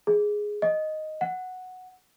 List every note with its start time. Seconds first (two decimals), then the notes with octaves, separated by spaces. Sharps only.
0.07 G#4
0.62 D#5
1.21 F#5